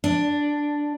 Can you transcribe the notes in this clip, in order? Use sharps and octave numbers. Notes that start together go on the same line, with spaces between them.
D4